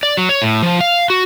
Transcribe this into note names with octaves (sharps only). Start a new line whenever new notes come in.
D5
F#3
C#5
A2
F3
F5
F#4